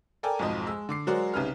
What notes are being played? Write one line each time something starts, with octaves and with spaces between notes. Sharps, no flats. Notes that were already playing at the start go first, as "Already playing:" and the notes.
A4 A#4 D5 G5 G#5
B1 F2 G#2 F3 D#5
G#3 E6
D3 D6 C7
F#3 G#3 F#4 A#4 C5 D5
C2 C#3 G3 D#4 B4 F6